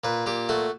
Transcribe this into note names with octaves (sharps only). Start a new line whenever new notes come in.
A#2 B4
A#2 G4
A3 F#4